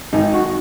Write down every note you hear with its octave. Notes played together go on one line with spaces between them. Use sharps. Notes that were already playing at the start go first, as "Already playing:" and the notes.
G#1 D#4
F#4